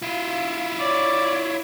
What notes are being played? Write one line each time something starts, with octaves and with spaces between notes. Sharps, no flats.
E4 F4 F5
C#5 D5